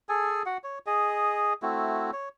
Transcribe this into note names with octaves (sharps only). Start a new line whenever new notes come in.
G#4 A4 G#5
F#4 F#5
C#5
G#4 D#5
A3 C4 E4 F#4
C#5